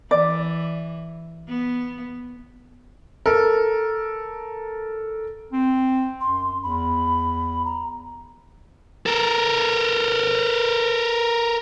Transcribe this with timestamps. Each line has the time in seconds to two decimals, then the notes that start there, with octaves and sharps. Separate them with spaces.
0.11 E3 D5
1.48 B3
3.26 A4 A#4
5.53 C4
6.21 F#2 C6
6.63 E2 B5
7.65 A#5
9.06 A4 A#4